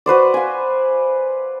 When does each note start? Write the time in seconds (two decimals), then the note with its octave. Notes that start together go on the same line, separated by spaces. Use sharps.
0.06 F#4 B4 C5 D5
0.34 F5 G#5